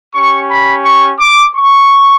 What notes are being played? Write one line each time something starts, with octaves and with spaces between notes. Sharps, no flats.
C#4 G4 C#6
B5
C#6
D6
C#6